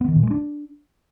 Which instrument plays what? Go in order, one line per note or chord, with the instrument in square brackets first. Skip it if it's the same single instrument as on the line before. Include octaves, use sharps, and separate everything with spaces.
[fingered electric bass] B3
D#3
A#2
G#3
D4